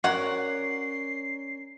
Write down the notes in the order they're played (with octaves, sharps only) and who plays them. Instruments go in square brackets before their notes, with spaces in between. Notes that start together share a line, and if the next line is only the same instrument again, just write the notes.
[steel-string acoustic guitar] C#4 A#4 D5 [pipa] F#4 C#5 F#5 [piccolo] C7